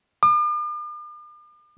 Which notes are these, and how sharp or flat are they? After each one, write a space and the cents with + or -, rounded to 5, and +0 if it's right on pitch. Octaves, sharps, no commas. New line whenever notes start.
D6 +45